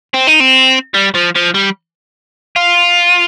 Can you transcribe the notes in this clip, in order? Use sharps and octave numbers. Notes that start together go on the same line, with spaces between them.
C4
D#4
C4
G3
F3
F3
G3
F4